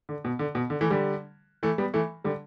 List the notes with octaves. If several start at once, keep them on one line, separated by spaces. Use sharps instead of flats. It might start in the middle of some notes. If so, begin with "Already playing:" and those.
D3
B2
D3
B2
D3
E3 A3
D3 G3
E3 A3
G3 B3
E3 A3
D3 G3